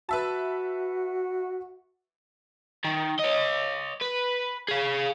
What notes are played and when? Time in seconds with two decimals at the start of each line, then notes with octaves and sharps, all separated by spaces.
0.09 F#4 B4 E5 A5
2.84 D#3
3.20 C#5 D#5
4.01 B4
4.68 G#4 F5